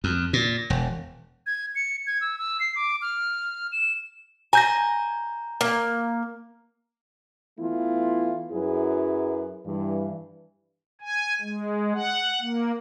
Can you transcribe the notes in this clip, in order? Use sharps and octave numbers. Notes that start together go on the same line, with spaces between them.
F2
A#2
E1
G#6
C#7
G#6
E6
E6
C7
D6
F6
E7
G#5 A#5 G6 A#6
A#3
E3 A3 B3 E4 F4
F#2 F#3 E4 G#4 B4
G2 E3
G#5
G#3
F#5
A#3